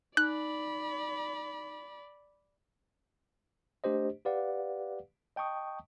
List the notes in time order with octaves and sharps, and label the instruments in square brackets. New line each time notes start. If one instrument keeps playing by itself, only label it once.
[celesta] D#4 [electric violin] D5 B5 [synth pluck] F#6
[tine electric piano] A3 D4 G4 C5 D#5
G4 B4 D5 F5 F#5
D#5 G5 A5 C#6 D#6